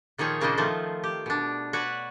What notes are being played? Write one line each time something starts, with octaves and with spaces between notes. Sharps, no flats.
A#2 D#3 F3 G#4 C#5
A#2 C#3 A#3 D4 C5 D#5
D#3 F3 A3 F4
G4
B2 D4
F#4 B4 C#5 D5